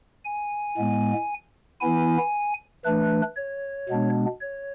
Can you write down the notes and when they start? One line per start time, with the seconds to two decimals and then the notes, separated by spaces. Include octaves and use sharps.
0.25 G#5
0.77 A2 G#3 B3
1.81 E3 B3 E4 G#5
2.85 E3 A3 D4 B4
3.37 C#5
3.89 B2 G#3 B3 D4
4.41 C#5